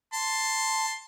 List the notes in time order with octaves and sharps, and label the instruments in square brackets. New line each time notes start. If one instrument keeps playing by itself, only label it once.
[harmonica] A5 C6